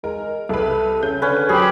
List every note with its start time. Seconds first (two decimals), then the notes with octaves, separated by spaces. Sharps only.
0.04 G#3 A#4
0.49 C2 A4 B4
1.03 C#3 G6
1.22 D3 C#4 B4
1.49 F#3 G4 G#4 C5 B5